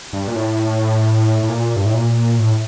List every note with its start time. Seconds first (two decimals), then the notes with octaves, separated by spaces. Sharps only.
0.13 G2
0.28 A#2
0.36 A2
1.43 A2
1.49 A#2
1.76 G2
1.86 A2
1.94 A#2
2.39 A2